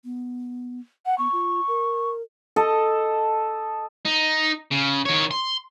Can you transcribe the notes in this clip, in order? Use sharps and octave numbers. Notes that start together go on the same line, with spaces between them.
B3
F#5
B3 C#6
F4
A#4
A4 D#5
D#4
C#3
D#3 C#5
C6